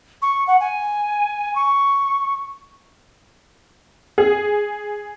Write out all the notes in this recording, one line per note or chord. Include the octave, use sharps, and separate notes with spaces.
C#6
F#5
G#5
C#6
G#4